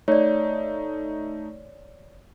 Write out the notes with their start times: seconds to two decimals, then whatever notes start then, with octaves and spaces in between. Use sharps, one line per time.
0.08 A3 D#4 C#5 D5